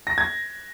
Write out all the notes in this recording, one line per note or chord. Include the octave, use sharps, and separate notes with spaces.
A#6
G#6